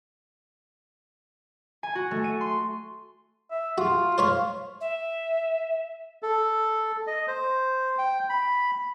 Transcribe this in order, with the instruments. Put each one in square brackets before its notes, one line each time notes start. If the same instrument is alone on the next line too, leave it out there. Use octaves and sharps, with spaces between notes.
[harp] G#5
F#4
A3
D#7
C6
[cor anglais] E5
[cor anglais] F4 [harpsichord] F#4
[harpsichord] C5 C#5 B5 [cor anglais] F5
[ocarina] E5
[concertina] A4
D#5
C5
G5
B5